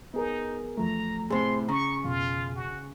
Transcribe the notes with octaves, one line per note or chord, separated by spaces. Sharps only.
B3 D#4 G#4 A#4
E2 F3 A3 A#5
A2 C3 G#4 C5 C6
C#3 A#5 C#6
F2 B2 F4
F#4